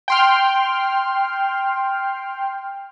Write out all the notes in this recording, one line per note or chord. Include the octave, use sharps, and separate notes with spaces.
G5 C6 F6